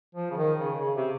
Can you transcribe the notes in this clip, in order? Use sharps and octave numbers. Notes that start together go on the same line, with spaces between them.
F3
C#3
D#3
C#3
C#3
C3